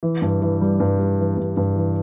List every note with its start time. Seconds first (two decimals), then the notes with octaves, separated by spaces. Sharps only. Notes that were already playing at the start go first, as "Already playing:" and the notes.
0.03 E3
0.22 G2
0.42 E3
0.62 G3
0.80 G2
0.99 G3
1.19 E3
1.38 G2
1.57 G2
1.76 E3